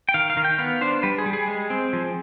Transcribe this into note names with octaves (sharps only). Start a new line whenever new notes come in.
G5
D#3 F5
F5
D#3
G5
B3 F5
D4 C5
G3 B4
G#4
G3
G#4
G#3
C4
F3